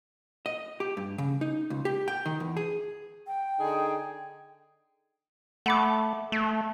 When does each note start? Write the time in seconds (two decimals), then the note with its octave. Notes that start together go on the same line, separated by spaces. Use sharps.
0.46 D#5
0.80 G4
0.97 G2
1.18 C#3
1.41 D#4
1.70 C#2
1.85 G4
2.08 G5
2.26 D#3
2.40 E2
2.57 G#4
3.27 G5
3.60 D3 D#4 G#4
5.66 A3 F#5 B5 D6
6.32 A3